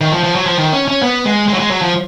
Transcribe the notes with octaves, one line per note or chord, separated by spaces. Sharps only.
D#3
F3
F3
F#3
F3
D#3
C#4
C#4
B3
G#3
G#3
F#3
G#3
F#3
F3